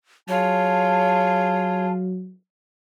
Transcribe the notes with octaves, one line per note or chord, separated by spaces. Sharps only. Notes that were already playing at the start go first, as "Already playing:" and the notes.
F#3 F4 G#4 C#5 A5